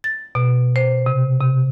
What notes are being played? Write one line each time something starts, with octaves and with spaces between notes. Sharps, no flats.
A6
B2
C5
C3
C3